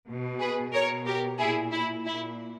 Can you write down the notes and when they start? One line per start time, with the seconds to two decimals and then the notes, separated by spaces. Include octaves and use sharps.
0.08 B2
0.40 G#4 B4
0.73 B2 A#4 C#5
1.06 G4 A#4
1.39 A#2 E4 G#4
1.72 E4
2.06 A#2 E4